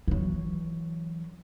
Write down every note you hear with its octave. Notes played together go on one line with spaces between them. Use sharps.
E3 F#3